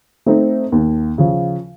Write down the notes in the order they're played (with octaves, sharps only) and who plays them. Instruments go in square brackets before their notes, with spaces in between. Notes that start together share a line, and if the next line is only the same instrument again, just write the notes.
[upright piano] A3 C4 D#4
D#2
C#3 F3